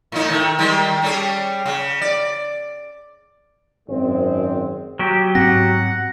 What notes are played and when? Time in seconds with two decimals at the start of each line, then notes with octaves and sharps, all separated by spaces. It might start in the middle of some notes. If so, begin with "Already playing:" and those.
0.12 A2 D#4
0.30 D#3 A3
0.59 D#3 G3 G#3
1.02 G3 C#4 G#4
1.66 C#3
2.01 D5
3.89 G#1 F#2 G#3 C4
4.99 F#3 B3 G4
5.35 G#2 C4 F#5 A#6